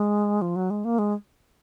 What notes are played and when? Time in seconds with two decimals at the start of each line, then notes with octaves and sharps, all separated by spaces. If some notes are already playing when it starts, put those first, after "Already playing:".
Already playing: G#3
0.42 F3
0.56 F#3
0.70 G#3
0.85 A#3
0.99 G#3